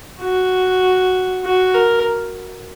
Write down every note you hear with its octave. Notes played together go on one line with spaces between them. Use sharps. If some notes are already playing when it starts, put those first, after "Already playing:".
F#4
F#4
A#4